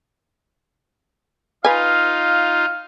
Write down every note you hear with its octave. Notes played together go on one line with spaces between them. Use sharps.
D#4 F4 B4 F5 G#5